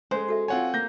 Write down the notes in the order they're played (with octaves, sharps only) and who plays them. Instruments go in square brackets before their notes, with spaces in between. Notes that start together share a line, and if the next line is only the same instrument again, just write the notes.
[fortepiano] G#3 [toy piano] C#4 A4 [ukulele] C5
[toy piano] F#4 A4 E5
[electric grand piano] C4 F#5 G#5 [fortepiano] F4 C#5
[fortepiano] A#3 [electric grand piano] G6 A#6